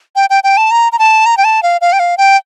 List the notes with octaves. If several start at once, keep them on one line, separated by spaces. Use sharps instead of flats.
G5
G5
G5
A5
A#5
A#5
A5
A#5
G5
A5
F5
F5
G5
F5
G5